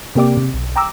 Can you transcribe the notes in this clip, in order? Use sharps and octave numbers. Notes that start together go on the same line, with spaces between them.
C3 A#3 G4 D5 D6
C3
B1
G5 A#5 D6 E6